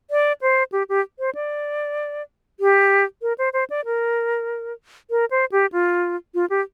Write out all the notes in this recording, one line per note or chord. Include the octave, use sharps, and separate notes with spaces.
D5
C5
G4
G4
C5
D5
G4
A#4
C5
C5
D5
A#4
A#4
C5
G4
F4
F4
G4